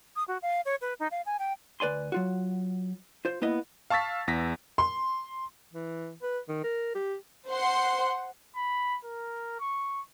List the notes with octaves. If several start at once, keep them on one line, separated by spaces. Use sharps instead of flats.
D#6
F#4
F5
C#5
B4
D#4
F5
G#5
G5
D2 B4 D5 G#5 C6
F#3 F4 F#4
F4 C5
A#3 B3 E4 D#5
F5 A5 C#6 E6 A6 B6
E2 A#6 B6
C6
E3
B4
D#3
A#4
G4
C5 F#5 C6
B5
A#4
C#6